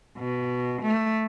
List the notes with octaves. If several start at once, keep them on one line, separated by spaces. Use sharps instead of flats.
B2
A3